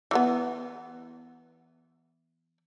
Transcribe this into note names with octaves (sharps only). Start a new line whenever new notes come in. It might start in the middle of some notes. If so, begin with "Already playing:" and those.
E3 A#3 B3